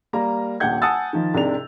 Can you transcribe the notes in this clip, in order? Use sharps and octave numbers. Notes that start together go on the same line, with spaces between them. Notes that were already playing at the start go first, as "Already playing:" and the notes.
G3 A#3 A#5
D#1 A#1 F#5 G6 G#6
F#5 G#5 A5 D#6 E6 A6
D#3 F3
C2 G#2 C3 D4 F7